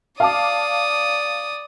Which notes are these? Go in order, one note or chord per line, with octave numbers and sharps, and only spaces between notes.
D5 F5 A5 D6 D#6